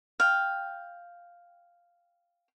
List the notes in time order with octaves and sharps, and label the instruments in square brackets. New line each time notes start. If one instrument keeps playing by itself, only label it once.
[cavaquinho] F5 G5